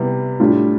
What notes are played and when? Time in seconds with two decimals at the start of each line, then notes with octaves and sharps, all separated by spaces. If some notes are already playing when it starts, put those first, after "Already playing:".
Already playing: C3 G3 B3 E4
0.40 A2 G3 D4 F4